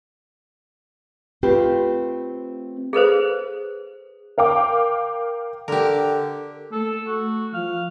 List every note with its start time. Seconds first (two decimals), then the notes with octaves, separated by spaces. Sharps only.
1.43 A3 C4 F4 G4 B4
2.93 G#4 A4 B4 C5
4.38 A#4 F5 G5 D6
5.68 D3 G4 A#4
6.72 A3 A4
7.07 F#4
7.54 F3 F5